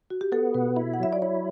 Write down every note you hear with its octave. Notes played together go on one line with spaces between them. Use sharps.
F#4
G4
B3 A4
B2 B4
E4
F#5
F#3 E5
D5
E4 C#5